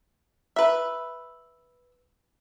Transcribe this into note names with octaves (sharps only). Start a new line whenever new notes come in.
B4 E5